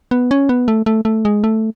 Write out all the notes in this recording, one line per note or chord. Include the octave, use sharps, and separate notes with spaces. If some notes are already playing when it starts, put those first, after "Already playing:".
B3
C#4
B3
A3
A3
A3
G#3
A3